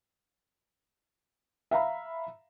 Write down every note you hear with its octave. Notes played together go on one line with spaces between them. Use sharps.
E5 F5 A#5 B5